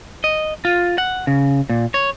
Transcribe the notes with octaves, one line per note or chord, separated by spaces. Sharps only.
D#5
F4
F#5
C#3
A#2
C#5